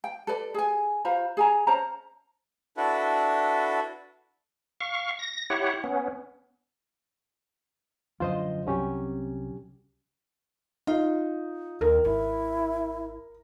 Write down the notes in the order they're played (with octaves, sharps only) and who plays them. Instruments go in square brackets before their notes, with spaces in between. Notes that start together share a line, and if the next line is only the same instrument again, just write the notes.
[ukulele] G5
A4 B4 D5
G#4 G#5
F4 C5 A#5 B5
G#4 G#5 A#5
C#4 C5 A5 A#5
[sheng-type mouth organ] D4 E4 F#4 A4 B4
[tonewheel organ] F5 C#6
A#6
E4 G4 C#5 F#5
B3 C#4
[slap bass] F#2 D3 F3 [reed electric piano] F4 C5 D#5
[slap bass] C2 C3 [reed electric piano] F#3 C#4 G4
[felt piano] D#4 [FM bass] F4
[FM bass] D#2 [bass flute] D#3 [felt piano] A#4
[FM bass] G#1 [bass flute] E4